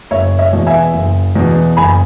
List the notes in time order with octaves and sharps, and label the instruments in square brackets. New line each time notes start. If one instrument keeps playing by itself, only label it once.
[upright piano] F#1 C#5 E5
C#5 E5
E2 B2
E5 G#5
F#1
E2 B2
F#1 G#5 B5